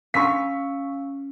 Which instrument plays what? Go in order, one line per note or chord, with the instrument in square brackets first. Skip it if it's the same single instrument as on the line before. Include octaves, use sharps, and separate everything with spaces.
[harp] C#4 [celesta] F5 E6 [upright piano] C#6 B6